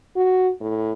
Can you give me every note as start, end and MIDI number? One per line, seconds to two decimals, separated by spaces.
0.16 0.49 66
0.61 0.93 45